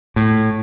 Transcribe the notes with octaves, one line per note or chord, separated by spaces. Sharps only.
A2